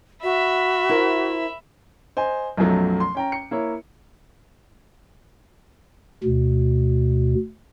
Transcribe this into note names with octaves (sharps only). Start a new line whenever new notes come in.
F#4 E5 B5
E4 A#4 C5
C5 D#5 G#5
B1 F#2 F3 F#3 A3
C6
C#4 G5 A#5
C#7
A#3 E4 C#5
D2 B2